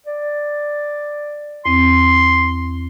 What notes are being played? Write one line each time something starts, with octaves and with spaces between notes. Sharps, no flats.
D5
E2 C4 C6